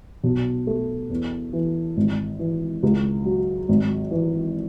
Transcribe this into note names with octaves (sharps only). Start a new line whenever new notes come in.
B1
A3
E2
E3
G#1
E3
C#2
F#3
G#1
E3